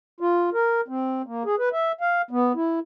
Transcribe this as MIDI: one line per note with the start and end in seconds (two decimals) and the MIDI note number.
0.20 0.50 65
0.54 0.81 70
0.88 1.22 60
1.26 1.43 58
1.46 1.55 68
1.59 1.69 71
1.73 1.92 76
2.01 2.22 77
2.31 2.52 59
2.56 2.79 64